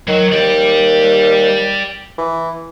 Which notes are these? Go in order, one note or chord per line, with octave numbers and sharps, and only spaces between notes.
D#3 F#3
D#2 D5 G5
E3